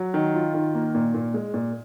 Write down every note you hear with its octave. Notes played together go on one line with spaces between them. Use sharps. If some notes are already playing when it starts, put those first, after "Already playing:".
Already playing: F#3
D#3
F4
D#3
A#3
A#2
A#2
G#3
A#2